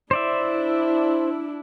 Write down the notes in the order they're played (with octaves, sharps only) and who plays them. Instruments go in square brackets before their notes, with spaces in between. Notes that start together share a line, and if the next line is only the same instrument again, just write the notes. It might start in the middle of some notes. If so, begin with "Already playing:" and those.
[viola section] D4 E4 [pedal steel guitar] C5 D5 E5